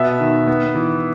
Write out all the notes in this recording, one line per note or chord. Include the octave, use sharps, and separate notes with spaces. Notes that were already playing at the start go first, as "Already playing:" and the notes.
Already playing: B2 B3 E5
D#3
B3
E3